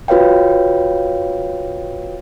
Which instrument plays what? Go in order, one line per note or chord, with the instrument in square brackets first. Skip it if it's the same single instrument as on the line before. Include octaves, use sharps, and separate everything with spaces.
[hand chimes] F4 F#4 B4 C#5 F5 G5